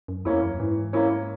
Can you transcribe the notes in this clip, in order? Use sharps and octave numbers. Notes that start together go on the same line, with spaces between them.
F#2
E2 A#3 C#4 E4
F#2
G#2 E3
A#3 C#4 E4